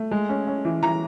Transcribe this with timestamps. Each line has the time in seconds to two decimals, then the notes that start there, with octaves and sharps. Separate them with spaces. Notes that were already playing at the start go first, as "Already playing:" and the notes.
Already playing: A3
0.11 G#3
0.29 C#4
0.47 C#4
0.65 E3
0.83 E3 A#5